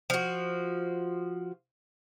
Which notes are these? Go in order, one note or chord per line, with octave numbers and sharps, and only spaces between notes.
F3 F#4